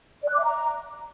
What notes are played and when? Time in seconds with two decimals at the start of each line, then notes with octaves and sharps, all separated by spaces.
0.23 D5
0.28 F#6
0.33 D6
0.39 E5
0.44 A#5